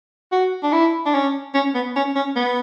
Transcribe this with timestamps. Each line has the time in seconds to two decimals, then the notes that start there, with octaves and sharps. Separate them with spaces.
0.32 F#4
0.63 D4
0.73 E4
1.06 D4
1.14 C#4
1.54 C#4
1.75 B3
1.96 C#4
2.15 C#4
2.36 B3